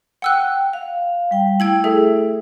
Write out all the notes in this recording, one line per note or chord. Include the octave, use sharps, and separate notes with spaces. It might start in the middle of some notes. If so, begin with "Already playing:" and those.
F#5 G5 E6 F#6
F5
G3 G5
A3 E4 G5 G#6 F#7
G#4 A4 E5